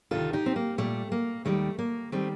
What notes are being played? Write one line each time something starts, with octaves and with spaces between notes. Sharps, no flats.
D2 C3 D#3 F4 A4
D#4 G4
C4
A#3
A#2 G3 A3
A#3
D#2 D#3 G3 A3
A#3
D#3 G3 A3 C4